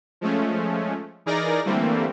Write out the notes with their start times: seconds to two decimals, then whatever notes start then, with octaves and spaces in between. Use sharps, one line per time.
0.21 F3 G#3 A3 C#4
1.26 E3 D#4 G#4 A#4 D5 A#6
1.65 D3 E3 G3 A3 A#3 C4